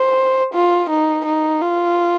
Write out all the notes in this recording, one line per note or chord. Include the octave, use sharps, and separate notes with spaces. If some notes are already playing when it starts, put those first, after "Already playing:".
Already playing: C5
F4
D#4
D#4
F4